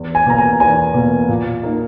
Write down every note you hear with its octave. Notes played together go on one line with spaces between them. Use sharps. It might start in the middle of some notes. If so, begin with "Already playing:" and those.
Already playing: E2
G#5
B2 A#3 A#5
G#5
E2 G#5
B2 A#3
A#2
A#3 D#4